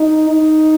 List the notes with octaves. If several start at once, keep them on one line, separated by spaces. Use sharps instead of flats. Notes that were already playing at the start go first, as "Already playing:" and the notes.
Already playing: D#4
D#4